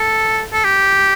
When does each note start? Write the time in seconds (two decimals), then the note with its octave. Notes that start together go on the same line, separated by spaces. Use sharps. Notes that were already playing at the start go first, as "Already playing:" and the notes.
Already playing: A4
0.53 A4
0.64 G4